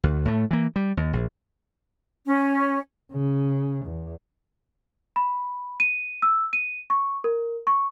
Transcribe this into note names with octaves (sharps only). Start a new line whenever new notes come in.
D2
A2 A3
E3 A#3
G3
D#2
A#1
C#4
C#3
E2
B5
D#7
E6
D#7
C#6
A#4
C#6